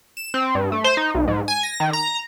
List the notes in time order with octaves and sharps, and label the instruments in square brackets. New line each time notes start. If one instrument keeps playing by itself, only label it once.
[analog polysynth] E7
C4
G2
A3
C5
D#4
B1
G#2
G#5
A#6
D#3
A#5